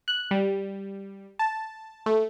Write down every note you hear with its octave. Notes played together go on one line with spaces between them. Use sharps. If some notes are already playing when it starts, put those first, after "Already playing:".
F#6
G3
A5
A3